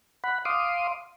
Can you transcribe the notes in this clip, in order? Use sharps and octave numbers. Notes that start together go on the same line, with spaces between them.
F#5 B5
F5 C6 D6 D#6